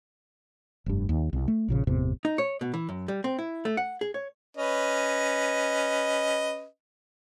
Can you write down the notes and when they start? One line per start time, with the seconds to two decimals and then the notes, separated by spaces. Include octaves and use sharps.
0.86 F1 G2
1.09 D#2
1.33 C2
1.48 A3
1.68 A#1 A#2 C#3
1.87 G1 E2 A2 C3
2.25 D#4
2.38 C#5
2.61 B2
2.74 E3
2.89 F#2
3.08 G3
3.24 C4
3.39 E4
3.65 A3
3.77 F#5
4.01 G#4
4.14 C#5
4.57 C#4 B4 D#5